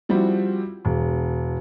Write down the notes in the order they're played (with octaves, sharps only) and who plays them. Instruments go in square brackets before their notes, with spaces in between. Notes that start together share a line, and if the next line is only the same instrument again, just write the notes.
[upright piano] F3 G3 C4 E4 F#4
E1